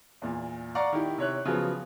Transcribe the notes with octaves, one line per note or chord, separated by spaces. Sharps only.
E2 A#2
D5 F5 F#5 A#5 C#6 D6
D#3 E4 G4
C3 C#5 F#6
C#3 F3 F#3 B3